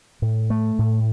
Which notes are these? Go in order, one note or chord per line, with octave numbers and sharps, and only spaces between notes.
A2
A3
A2